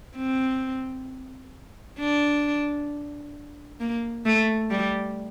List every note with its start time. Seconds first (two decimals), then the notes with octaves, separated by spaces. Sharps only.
0.17 C4
1.99 D4
3.80 A#3
4.25 A3
4.70 G3